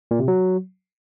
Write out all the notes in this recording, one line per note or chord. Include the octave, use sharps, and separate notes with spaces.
A#2
C3
F#3